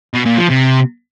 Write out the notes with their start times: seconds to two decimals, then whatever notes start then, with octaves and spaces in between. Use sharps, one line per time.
0.14 B2
0.26 A#2
0.38 F3
0.49 C3